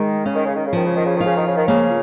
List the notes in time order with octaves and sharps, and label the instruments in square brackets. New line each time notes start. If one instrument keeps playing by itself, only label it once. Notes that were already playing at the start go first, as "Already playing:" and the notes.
Already playing: [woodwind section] D#3 [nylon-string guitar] G#3
[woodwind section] C#3 [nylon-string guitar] C#4
[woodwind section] D#3
C#3
D#3
C#3
[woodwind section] D#3 [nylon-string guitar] F3
[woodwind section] C#3
D#3
C#3
[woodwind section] D#3 [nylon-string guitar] F4
[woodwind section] C#3
D#3
C#3
D#3
[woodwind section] C#3 [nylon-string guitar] A#3